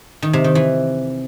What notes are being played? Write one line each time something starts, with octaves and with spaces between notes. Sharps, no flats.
D#3
C3
D#3
E3